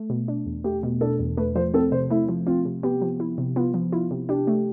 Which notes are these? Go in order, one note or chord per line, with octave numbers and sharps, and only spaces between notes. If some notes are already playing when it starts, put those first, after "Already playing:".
Already playing: A3
B2
D4
E2
A3 G4
B2
D4 A4
E2
A3 B4
F3 C5
C4 A4
C3 C5
A3 E4
F3
C4 F4
C3
B3 G4
F3
E4
C3
B3 F4
F3
E4 F4
C3
D4 G4
A3